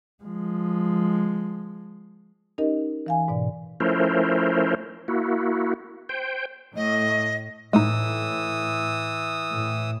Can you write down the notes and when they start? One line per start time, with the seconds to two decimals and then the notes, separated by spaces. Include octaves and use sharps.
0.24 F3 G#3
2.58 C#4 D#4 G4 A#4 D#5
3.06 E3 F5 G#5
3.28 G#2 B2 D5
3.80 F3 A3 C#4 E4 A#4 C5
5.08 A#3 E4 F#4
6.09 C5 G5
6.76 A2 D#5
7.73 A2 E3 G#3 A3 D#4 D#6 E6
9.51 A2